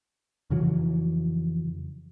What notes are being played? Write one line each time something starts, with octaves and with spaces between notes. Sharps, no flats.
F2 C#3 E3 F#3